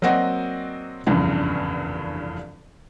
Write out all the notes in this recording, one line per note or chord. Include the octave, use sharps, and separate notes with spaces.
F#3 A#3 C4 F#4 D5 D#5
F1 A#1 E2 G2 C#3 E3